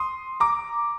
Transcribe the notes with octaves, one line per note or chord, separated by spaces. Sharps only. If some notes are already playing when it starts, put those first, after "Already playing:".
Already playing: C6 D#6
A#5 D6